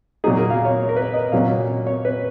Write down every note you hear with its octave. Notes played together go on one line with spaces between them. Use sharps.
A#2 F#3 A#3 D#4 G#4
A#4
F5
C#5
A#4
B4
D#5
A#2 F#3 C#4 F5
C#5
B4